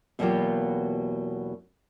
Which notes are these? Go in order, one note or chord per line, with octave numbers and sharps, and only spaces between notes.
E2 B2 F#3 A#3 F4 G4